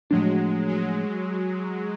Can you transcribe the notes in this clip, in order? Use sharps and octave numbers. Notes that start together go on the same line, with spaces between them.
A2 F3 F#3 G#3 A3 D4
F#3 G#3